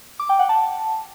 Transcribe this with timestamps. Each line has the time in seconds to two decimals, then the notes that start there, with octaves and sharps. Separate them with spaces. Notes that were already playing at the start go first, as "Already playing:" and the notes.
0.20 D6
0.29 G5
0.39 F#5
0.49 A5